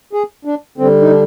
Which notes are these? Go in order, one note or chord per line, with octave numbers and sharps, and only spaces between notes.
G#4
D4
D3 G3 C4
D#4
D4